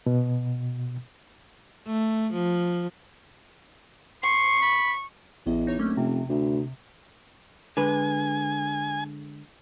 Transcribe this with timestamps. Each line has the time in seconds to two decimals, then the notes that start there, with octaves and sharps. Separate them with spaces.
0.06 B2
1.87 A3
2.33 F3
4.23 C6 C#6
4.62 B5
5.46 A1 E2 D#5
5.67 D#4 C#5
5.79 D1 A3 A#3 C#4
5.97 F1 C3
6.29 D2
7.77 D3 G#3 B4 G#5